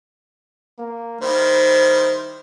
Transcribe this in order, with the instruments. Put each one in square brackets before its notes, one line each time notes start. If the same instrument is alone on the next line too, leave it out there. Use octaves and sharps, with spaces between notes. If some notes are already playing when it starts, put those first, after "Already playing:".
[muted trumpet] A#3
[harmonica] D#3 G3 E4 [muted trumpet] C5